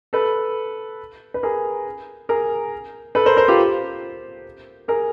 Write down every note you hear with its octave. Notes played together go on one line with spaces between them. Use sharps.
A4 B4
B4
G#4 A#4
G#4 A#4
A4 B4
A#4 C5
A#4 C5
F4 G4
G#4 A#4